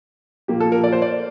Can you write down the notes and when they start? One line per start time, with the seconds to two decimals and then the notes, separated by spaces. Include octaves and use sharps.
0.48 A#2 F3 A#3 G4
0.60 A4
0.72 A#4
0.84 D5
0.92 C5
1.02 D5